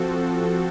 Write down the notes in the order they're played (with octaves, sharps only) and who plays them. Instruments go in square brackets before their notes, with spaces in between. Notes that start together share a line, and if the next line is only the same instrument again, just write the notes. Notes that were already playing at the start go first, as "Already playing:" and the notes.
Already playing: [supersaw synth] F3 C4 F#4 A4